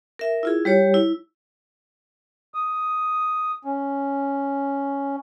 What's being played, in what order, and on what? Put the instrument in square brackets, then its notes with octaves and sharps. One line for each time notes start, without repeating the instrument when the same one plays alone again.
[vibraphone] A#4 E5
E4 F4 G#4
G3 G4 C#5
E4
[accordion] D#6
C#4